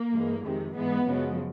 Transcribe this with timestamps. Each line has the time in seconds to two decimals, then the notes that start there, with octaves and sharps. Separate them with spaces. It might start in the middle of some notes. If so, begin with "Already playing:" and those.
Already playing: A#3
0.13 G2 E3 G#3
0.44 F2 C3 D#3 G#3
0.75 G#2 E3 G#3 B3
1.05 F#2 C#3 F3 G#3